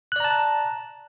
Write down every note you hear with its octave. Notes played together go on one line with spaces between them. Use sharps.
D5 A5 A#5 F#6